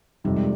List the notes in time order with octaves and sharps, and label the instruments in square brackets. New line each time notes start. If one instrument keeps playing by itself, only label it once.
[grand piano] F2 C3 D#3 [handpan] G3
[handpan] G#3